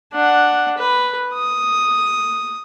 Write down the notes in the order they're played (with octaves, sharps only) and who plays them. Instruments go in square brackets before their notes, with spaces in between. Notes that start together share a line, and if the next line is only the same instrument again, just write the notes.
[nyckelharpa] D4 F#5
B4
D#6